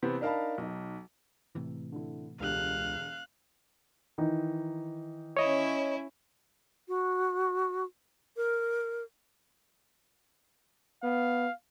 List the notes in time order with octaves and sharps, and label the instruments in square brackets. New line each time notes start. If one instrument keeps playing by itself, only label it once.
[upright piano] C3 E3 B3 C4
D4 D#4 A#4 F5 A5 B5
B1 D#4
[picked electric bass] A2 C3 E3
[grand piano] D3 E4
[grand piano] E1 D3 G4 [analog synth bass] C#2 [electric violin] F5 F#6
[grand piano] D#3 E3 D#4
[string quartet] C#4 E4 [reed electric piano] C#5 D#5
[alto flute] F#4
A#4
[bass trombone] B3 [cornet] F5